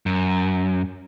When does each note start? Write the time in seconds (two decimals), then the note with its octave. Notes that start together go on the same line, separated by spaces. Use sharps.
0.06 F#2